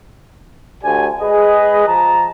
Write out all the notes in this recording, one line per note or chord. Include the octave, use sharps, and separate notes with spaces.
D2 G4 D5 G#5
G#3 G#4 B4 D#5
F3 A5 A#5